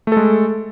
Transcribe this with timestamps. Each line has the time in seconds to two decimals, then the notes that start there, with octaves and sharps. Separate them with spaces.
0.07 A3
0.12 A4
0.17 G#3